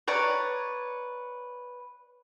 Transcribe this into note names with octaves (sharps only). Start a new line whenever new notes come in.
B4 C#5 D5 A#5